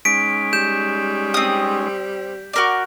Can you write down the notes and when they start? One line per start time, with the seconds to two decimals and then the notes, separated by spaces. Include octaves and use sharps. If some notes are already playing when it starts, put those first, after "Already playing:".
0.05 G#3 C#4 D#4 B6 D7
0.53 G3 G6 E7
1.34 C4 D#6
2.53 F#4 A#4 D5